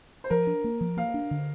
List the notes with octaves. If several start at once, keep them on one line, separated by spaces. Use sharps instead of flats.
C5
F3 A#4
D4
A#3
F3
A#3 F5
D4
D3